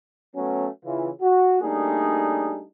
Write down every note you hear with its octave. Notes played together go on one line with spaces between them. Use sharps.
F#3 A3 B3 C#4
C#3 E3 F4
F#4
G3 A3 A#3 D4 D#4 G#4